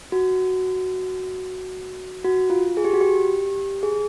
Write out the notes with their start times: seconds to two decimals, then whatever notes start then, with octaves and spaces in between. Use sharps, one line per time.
0.12 F#4
2.24 F#4
2.50 F4
2.77 G#4
2.85 G4
2.93 F#4
3.01 G4
3.83 G#4